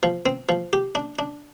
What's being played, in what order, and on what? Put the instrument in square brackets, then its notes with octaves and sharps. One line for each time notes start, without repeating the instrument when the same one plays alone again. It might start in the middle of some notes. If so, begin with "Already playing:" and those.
[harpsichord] F3
C4
F3
G4
D4
D4